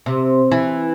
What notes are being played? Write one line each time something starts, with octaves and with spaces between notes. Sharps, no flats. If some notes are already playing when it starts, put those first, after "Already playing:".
C3
E3